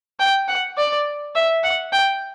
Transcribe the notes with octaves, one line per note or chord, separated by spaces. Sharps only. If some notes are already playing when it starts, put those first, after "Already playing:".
G5
F#5
D5
E5
F#5
G5